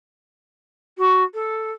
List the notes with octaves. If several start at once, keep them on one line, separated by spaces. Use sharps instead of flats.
F#4
A4